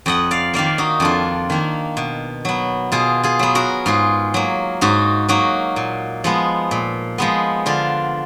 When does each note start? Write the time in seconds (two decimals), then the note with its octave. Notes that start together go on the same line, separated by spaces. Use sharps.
0.06 F2 D#5 F#5
0.31 D5 F5
0.54 D#3 A#3 D5 F5
0.78 D#4 F#4
1.00 F2 D4 F4
1.50 D#3 A#3
1.97 B2
2.45 F#3 B3
2.92 B2 F4 G#4
3.23 F4 G#4
3.39 F#3 B3
3.55 F#4 A#4
3.86 G#2 F4 G#4
4.34 F#3 A#3
4.81 G#2 D#4 F#4
5.29 F#3 A#3 D#4 F#4
5.76 A#2
6.24 F3 G#3 B3
6.71 A#2
7.18 F3 G#3 B3
7.66 D3 D4 F4